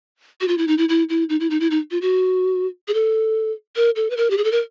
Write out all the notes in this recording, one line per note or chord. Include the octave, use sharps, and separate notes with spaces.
F#4
F4
E4
D#4
E4
E4
E4
D#4
E4
D#4
E4
D#4
F4
F#4
G#4
A4
A#4
A4
B4
A#4
G4
G#4
A4
A#4